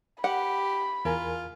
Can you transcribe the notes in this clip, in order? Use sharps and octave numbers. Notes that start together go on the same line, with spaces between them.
G4 F#5 B5
E2 F4 A#4 G#5